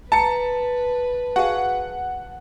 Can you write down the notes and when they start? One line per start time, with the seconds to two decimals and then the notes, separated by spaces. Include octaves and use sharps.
0.12 B4 A5 A#5 C#7
1.36 F#4 G#4 F5 F#5